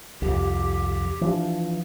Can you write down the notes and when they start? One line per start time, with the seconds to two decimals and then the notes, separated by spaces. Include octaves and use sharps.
0.22 C2 F2 G4
1.21 E3 F3 D4